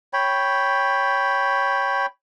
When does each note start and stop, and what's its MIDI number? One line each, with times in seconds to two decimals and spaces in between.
0.13 2.06 73
0.13 2.06 79
0.13 2.06 83